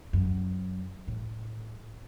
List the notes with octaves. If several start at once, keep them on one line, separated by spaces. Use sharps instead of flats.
F#2
A2